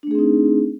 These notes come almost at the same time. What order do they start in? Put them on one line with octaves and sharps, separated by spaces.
D4 A3 G#4 C4 D#4